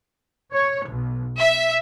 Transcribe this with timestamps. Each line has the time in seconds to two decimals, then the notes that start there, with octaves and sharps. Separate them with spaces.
0.52 C#5
0.86 B1
1.39 E5